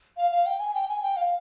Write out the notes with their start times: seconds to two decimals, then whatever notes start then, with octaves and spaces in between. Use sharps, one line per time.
0.17 F5
0.31 F5
0.46 G5
0.60 G#5
0.74 G5
0.88 G#5
1.03 G5
1.16 F5